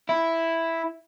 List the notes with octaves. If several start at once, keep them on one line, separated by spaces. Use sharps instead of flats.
E4